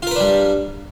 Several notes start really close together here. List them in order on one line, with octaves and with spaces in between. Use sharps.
F4 A#4 B4 D4 G3